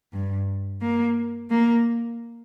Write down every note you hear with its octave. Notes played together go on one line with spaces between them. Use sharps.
G2
A#3
A#3